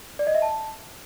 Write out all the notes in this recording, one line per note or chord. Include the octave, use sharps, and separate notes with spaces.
D5
D#5
E5
A5